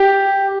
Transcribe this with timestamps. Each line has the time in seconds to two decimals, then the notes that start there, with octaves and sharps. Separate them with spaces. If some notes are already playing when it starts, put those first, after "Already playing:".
Already playing: G4